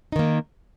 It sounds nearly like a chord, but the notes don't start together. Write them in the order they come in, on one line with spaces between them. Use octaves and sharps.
D#4 D#3 A#3